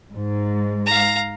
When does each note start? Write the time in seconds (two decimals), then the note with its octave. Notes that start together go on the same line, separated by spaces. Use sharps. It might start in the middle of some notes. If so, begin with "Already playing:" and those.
0.14 G#2
0.86 F5 A#5